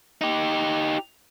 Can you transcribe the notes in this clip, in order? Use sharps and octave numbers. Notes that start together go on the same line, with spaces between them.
D#4 G4